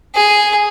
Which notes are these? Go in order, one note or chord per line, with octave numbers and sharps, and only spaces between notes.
G#4